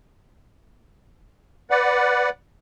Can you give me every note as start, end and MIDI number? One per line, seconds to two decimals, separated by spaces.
1.70 2.30 71
1.70 2.30 74
1.70 2.30 78